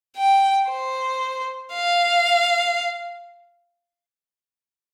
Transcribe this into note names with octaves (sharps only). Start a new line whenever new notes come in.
G5
C5
F5